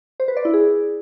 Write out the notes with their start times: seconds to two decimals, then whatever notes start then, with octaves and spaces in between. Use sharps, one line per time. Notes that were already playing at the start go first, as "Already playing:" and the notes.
0.20 C5
0.28 B4
0.37 D5
0.45 E4
0.54 G#4